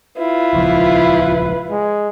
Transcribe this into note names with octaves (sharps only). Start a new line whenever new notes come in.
E4 F4 B4
D#1 C#2 F3
G#3